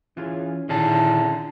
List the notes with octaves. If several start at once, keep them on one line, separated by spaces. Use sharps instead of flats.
E3 C#4 F4 G#4
A#2 D3 D#3 C#4 E4 G#4 A5